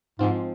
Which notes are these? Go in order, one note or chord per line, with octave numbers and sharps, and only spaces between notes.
G#2 F3 G#3 C4 F4